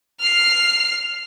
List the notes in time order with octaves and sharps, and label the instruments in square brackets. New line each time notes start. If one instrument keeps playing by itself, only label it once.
[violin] F6 C7